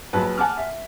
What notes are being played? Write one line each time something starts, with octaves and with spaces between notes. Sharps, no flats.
A#1 F#3 B4 A5
F#5 G#5 A5 D6 F6
E5